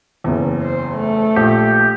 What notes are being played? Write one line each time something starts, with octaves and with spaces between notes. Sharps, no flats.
F#1 E2
C5
A3
A#1 G4